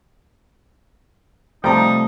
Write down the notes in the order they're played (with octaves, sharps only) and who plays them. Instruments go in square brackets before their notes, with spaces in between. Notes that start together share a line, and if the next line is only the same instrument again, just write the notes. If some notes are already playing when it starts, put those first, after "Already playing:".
[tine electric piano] C3 A3 [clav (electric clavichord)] F3 G3 G5 [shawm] D#4 [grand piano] A5 A#5